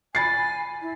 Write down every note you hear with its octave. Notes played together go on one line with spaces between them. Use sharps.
G#5 B5 A6 C7
E4